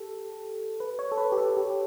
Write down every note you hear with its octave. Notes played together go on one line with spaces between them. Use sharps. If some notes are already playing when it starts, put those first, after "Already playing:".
Already playing: G4 A4
B4
C#5
A4
B4
G4
A4
G4